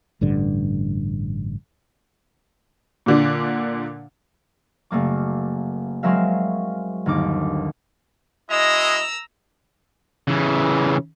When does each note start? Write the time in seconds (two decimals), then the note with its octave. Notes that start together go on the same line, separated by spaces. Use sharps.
0.21 A1 G2 D3
3.06 A#2 D3 D4
4.91 F#1 A3 A#3 D6
6.03 F#3 G#3 C4 A#4 E5 F5
7.06 G1 D#2 A#4 D6
8.50 G#3 E4 F#4 D#5 A#5 E6
10.28 C#3 E3